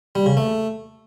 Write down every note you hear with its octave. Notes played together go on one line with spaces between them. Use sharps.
G3
C#3
A3